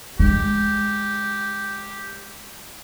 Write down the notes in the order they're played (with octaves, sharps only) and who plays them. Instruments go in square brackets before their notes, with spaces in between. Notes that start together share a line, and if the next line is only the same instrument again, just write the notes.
[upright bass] G#3 [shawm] G4